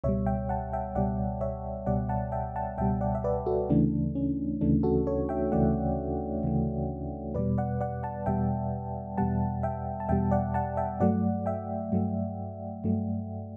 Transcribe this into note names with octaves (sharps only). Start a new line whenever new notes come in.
C#2 B2 G3 C#5 E5
E5 G5
F#5 A5
E5 G5
C#2 B2 G3 D5 F#5
C#5 E5
C#2 B2 G3 D5 F#5
F#5 A5
E5 G5
F#5 A5
C#2 B2 G3 E5 G5
D5 F#5
E5
B4 D5
F#4 A4
D2 C#3 E3 A3 D4
C#4
D2 C#3 E3 A3 D4
F#4 A4
A4 C#5
E5 G5
D2 C#3 E3 A3 D5 F#5
D2 C#3 E3 A3
E2 B2 G3 B4 D5
D5 F#5
D5 F#5
F#5 A5
E2 B2 G3 E5 G5
E2 B2 G3 F#5 A5
E5 G5
A5
E2 B2 G3 E5 G5
D5 F#5
F#5 A5
E5 G5
G2 F#3 A3 D5 F#5
E5 G5
G2 F#3 A3
G2 F#3 A3